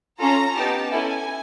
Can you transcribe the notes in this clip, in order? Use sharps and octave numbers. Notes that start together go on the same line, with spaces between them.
C#4 F4 A4 A#5
B3 D#4 G4 A5
C#4 E4 A4 G#5